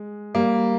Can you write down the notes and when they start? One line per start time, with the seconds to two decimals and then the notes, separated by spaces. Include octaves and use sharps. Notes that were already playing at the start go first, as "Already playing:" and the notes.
Already playing: G#3
0.35 G3 A#3